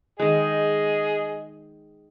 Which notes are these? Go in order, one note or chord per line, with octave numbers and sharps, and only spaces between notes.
D#3 G#3 G#4 D#5